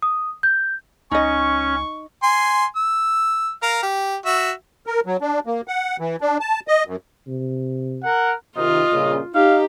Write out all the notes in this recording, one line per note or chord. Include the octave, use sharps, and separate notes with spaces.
D#6
G6
C#2 C#4 D#4 D#5 C#6
G#5 C6
E6
A#4 F5
G4
F#4 E5
A#4
F#3
D4
A#3
F#5
E3
D4
A5
D#5
F#2
C3
A#4 F#5
C3 D#3 F4 D#5
G2 A#2 C#3
D#4 G4 F5